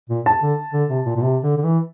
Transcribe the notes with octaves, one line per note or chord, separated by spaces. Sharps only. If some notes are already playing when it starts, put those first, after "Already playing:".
A#2
A5
D3
D3
C3
A#2
A#2
C3
D3
D3
E3